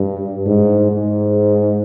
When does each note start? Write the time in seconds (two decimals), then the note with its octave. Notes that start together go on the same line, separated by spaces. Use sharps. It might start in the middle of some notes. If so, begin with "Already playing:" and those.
Already playing: G2
0.46 G#2
0.91 G#2